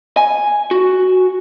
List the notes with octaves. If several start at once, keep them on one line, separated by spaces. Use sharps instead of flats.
G#5
F#4